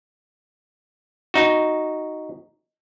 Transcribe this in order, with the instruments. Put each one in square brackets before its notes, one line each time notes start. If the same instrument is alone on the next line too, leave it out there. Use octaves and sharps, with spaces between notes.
[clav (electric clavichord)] D#4 F#4